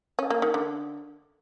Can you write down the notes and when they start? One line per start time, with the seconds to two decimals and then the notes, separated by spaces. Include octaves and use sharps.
0.19 C#4
0.30 A#3
0.42 D#3
0.54 D3